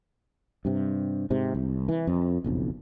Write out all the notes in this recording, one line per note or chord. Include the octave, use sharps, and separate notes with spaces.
G2 C3
G#2 C3
C2
E3
F2
F#1 B1 F2